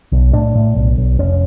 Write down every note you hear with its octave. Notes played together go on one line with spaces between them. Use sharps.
B1
A2 D4
A2
B1
B1
F1 C#4